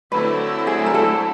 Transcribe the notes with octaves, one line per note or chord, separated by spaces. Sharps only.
D3 F#3 A3 C4 E4 B4
G#4
A#4
A4